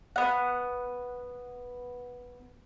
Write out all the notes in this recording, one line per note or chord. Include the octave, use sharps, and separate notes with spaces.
B3 F#5